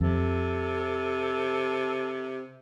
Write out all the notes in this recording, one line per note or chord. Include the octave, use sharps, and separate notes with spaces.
F2 C3 A4